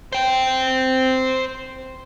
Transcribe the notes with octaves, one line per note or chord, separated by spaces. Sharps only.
C5 G5